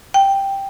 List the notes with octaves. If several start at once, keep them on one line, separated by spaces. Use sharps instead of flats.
G5